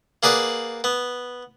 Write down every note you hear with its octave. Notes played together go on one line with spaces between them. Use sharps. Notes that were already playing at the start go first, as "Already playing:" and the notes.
A#3 G#4 B4 D5 F#5
B3